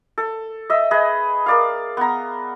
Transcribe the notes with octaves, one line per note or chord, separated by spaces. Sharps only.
A4
D#5 E5
G#4 B4 D#5 B5
A#4 D5 F5
B3 A#5